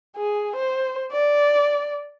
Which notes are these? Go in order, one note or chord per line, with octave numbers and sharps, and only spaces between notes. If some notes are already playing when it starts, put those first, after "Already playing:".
G#4
C5
D5